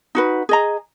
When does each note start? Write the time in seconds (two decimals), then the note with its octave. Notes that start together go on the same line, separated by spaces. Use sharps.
0.15 D#4 F#4 B4
0.49 G#4 D#5 A#5